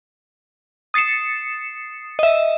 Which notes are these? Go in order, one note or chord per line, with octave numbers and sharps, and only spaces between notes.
D#6 A6 C7 C#7 E7
D#5 E5